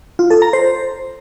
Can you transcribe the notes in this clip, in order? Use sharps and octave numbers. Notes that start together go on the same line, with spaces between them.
F4
A4
A#5
C5